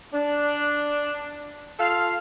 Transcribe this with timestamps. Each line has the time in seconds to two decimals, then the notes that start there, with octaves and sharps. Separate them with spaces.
0.13 D4
1.80 F4 A4 F5